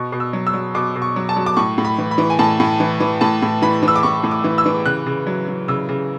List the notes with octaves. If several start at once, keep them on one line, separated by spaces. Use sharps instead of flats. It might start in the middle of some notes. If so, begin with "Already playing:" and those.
Already playing: B2 C#6
B2
E6
F#3
E6
F#3
B2 D6
B2
C#6
F#3
A5
F#3
D6
A2 C#6
A2
B5
E3
B5
E3
G#5
A2 A5
A2
E3
E3
A2 A5
A2
E3 B5
E3
E6
D6
A2 C#6
A2
D6
E3
E6
E3
C#3 F#6
C#3
F#3
F#3
C#3 E6
C#3